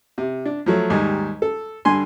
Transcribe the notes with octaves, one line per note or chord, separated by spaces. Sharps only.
C3
D4
F3 F#3 A3
D#2 G#2 G3
A4
G2 D3 G#5 C6